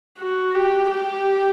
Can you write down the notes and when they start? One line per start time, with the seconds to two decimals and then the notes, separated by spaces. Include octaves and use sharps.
0.18 F#4
0.55 G4
0.91 G4